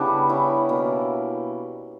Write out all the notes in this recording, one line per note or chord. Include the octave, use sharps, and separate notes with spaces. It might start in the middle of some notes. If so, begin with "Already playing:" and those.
Already playing: C#3 G3 B3 D4 E4
C#4 E4
B2 A#3